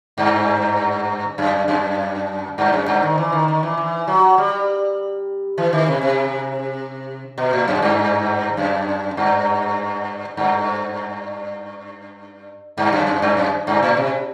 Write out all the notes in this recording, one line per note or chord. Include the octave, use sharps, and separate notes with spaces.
G2
F#2
F#2
G2
F#2
G2
D#3
E3
D#3
D#3
E3
E3
F#3
G3
E3
D#3
C3
C3
B2
A2
F#2
G2
F#2
G2
G2
G2
F#2
F#2
G2
F#2
G2
A2
C3